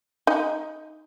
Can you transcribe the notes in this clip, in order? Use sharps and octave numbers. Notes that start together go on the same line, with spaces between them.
D#4 D#5